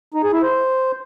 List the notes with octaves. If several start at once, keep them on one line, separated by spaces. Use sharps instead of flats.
D#4
G#4
E4
C5